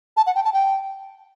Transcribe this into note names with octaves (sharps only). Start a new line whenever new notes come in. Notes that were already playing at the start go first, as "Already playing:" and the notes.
A5
F#5
G5
A5
G5